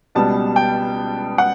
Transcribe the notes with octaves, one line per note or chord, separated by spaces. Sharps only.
C#2 B2 G3 B3 A5
G5
F#5